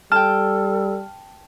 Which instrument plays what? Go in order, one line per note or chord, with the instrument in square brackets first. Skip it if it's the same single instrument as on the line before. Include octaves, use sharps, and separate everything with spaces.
[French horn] G3 [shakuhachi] A4 [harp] G5 A5 [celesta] F6